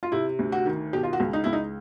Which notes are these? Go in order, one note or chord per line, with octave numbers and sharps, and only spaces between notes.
F4
C3 E4
D2
F#4
D#3
B2 G4
F4
F#4
C#2
D#4
C#2 E4
D#4